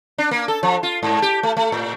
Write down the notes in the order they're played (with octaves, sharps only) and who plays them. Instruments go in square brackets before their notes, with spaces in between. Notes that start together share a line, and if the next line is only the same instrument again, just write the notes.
[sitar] D4
A#3
A4
F3
F4
G#2
G4
A3
A3
A2